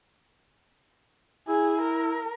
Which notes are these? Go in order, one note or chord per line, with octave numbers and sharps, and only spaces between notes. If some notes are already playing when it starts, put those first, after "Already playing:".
E4 G#4
A#4